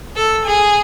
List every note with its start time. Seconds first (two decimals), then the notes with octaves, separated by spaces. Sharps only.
0.16 A4
0.44 G#4